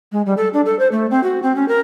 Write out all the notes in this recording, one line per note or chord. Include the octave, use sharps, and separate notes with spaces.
G#3
G3
A4
D4
A4
C5
A3
C4
F#4
C4
C#4
A#4